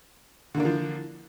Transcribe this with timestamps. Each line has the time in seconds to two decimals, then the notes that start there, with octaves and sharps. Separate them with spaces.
0.55 D3
0.57 A#3
0.60 D4
0.62 E3
0.65 F3